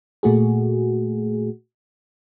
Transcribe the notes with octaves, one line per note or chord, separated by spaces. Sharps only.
A#2 A3 F#4 G#4